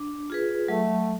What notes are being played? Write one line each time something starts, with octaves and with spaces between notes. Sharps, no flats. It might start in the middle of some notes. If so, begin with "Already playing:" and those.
Already playing: D4
F4 G#4 B4
F#3 A3